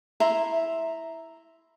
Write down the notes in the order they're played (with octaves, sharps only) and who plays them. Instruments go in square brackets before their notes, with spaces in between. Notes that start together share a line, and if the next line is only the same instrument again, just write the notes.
[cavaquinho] E4 E5 A#5 C6